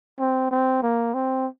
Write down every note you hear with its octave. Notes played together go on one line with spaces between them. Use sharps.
C4
C4
A#3
C4